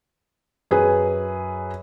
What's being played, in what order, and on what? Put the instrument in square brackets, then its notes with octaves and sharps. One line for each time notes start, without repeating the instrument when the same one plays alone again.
[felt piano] F#2 G#4 B4